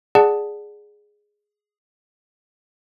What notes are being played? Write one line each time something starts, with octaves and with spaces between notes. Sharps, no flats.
G#4 D5 F#5 A5